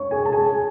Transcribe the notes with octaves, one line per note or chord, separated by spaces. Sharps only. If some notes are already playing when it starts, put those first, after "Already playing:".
Already playing: C#5 C#6
G#4 G#5
A5
G#4 G#5